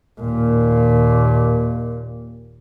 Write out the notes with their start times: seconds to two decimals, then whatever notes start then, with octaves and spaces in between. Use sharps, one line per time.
0.21 D#2 A#2